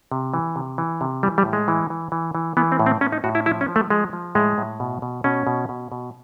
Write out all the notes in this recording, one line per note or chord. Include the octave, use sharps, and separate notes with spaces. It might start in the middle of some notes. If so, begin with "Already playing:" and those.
C3
E3
C3
E3
C3
E3 G3
G3
A2
G#3
E3
E3
E3
E3
E3 B3
C4
A2
C4
A2 C#4
D#4
A2 F#4
E4
F3 E4
C#4
F3
A3
F3 G#3
F3
A2 G#3
A2
B2
B2
B2 C#4
B2
B2
B2